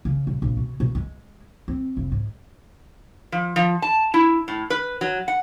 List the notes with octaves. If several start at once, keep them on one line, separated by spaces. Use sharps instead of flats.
C#3
D#1
A#1
B2
B2
G#3
C4
F1
G#2
F3
F3
A5
E4
A2
B4
F#3
F#5